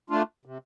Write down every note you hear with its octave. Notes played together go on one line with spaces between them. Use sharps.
A3 D4 F4
C3